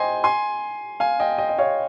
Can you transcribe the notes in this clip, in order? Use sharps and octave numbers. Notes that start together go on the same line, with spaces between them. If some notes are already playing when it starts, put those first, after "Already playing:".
Already playing: C5 D#5 G5 G#5 C6
G#5 C6
F5 G#5
D#5 G5
D#5 G5
D#5
C#5 F5